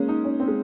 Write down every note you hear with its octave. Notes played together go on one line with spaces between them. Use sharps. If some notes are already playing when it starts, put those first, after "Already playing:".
Already playing: G#3 A#3 C#4
D#4
C#4
C4
G#3